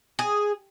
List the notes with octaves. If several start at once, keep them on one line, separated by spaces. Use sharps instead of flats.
G#4